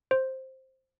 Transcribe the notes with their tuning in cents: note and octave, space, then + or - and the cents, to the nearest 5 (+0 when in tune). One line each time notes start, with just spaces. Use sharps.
C5 +10